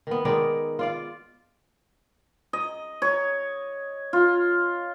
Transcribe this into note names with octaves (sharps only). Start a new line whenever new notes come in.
D#3 B3
D#3 G#3 D#4 D5
F4 D5 F5
D#5
C#5
F4